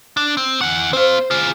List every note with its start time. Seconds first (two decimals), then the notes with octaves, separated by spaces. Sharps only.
0.17 D4
0.37 C4
0.61 E3 F#5
0.93 C4 C5 F5
1.31 F4 G#4